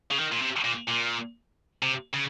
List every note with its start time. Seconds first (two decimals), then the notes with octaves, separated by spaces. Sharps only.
0.11 C#3
0.18 D#3
0.32 A#2
0.41 C3
0.65 A#2
0.88 A#2
1.82 C3
2.13 C#3